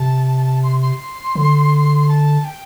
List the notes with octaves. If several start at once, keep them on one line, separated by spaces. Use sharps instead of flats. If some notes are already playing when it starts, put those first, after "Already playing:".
Already playing: C3 A5
C6
C6
D3
A5
G5